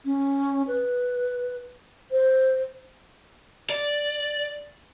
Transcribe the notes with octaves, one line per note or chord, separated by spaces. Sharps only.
C#4
B4
C5
D5